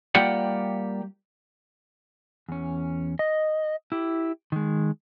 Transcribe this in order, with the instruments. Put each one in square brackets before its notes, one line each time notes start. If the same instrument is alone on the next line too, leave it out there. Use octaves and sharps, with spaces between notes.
[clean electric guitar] G3 A#3 F4 G4 D5 F#5
[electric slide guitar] E2 C#4
D#5
E4 G4
D#3 G#3